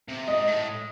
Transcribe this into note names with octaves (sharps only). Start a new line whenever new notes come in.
C3
G#2 D#5
A2